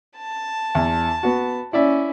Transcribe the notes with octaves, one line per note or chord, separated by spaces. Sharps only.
A5
E2
B3 F#4
C#4 E4 D5 E5